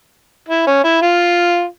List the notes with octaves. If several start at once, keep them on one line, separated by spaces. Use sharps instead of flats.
E4
C#4
E4
F4